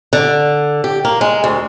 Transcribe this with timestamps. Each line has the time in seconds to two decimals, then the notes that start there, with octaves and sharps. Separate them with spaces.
0.13 D3
0.84 G4
1.05 A#3
1.21 G#3
1.44 D2